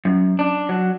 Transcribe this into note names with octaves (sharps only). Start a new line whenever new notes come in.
F#2
D4
F#3